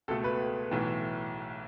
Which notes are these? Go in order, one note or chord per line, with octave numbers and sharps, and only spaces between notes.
C#2 B2 A3 A4
B4
B1 A2 E3